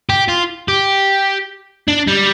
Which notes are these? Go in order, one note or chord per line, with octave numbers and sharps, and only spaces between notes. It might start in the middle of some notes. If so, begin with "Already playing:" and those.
G4
F4
G4
D4
G3